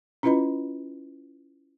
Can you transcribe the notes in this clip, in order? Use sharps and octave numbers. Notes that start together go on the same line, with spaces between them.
C#4 E4 F4 B4 D#5 B5